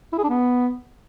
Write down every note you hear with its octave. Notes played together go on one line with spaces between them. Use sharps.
E4
G#4
D4
B3